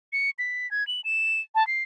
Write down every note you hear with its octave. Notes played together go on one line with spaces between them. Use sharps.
C#7
B6
G#6
F#7
E7
A5
C7